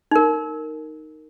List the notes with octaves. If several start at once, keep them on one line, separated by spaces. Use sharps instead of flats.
D#4 A#4